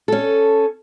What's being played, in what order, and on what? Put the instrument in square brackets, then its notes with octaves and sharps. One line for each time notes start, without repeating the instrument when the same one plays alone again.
[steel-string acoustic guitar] C#4 A4